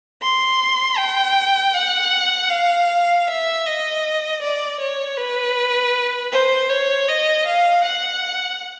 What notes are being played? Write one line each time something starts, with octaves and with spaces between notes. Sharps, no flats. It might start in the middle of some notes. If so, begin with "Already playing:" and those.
C6
G5
F#5
F5
E5
D#5
D5
C#5
B4
C5
C#5
D#5
F5
F#5